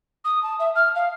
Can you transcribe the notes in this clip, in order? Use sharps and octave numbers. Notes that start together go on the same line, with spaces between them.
D#6
A5
E5
F6
F5